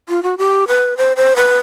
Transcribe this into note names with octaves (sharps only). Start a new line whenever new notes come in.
F4
F#4
G4
B4
C5
C5
B4